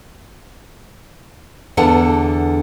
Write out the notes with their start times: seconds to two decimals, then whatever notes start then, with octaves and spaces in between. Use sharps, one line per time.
1.77 E2 D3 A4 F#5 A5